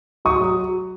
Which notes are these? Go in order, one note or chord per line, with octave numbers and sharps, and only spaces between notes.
F#3 C#6 D#6
F#3